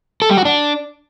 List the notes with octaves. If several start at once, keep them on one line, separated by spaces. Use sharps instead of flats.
A4
G3
F#4
D4